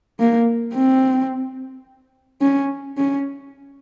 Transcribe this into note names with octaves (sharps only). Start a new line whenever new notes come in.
A#3
C4
C#4
C#4